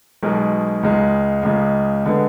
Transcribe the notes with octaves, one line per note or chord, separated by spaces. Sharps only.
B1 B2 G#3
C#2 C#3 G#3
C#2 C#3 G#3
D3 G#3 B3